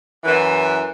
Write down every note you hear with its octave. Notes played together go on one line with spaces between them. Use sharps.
F#2 E3